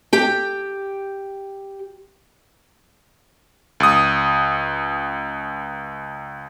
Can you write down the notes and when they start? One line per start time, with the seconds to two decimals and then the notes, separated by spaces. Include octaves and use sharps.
0.13 G4 G5
3.80 C#2 D#6